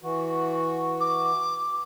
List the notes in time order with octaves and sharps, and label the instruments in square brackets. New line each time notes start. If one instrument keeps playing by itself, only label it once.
[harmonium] E3 F#4
[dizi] D6